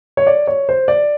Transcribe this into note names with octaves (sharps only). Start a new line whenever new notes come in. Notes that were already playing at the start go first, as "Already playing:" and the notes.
C#5
D5
C#5
C5
D5